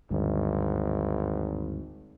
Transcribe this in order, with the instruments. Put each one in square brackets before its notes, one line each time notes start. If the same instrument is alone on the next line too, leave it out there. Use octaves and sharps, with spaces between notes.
[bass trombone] G#1 [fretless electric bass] D2 G2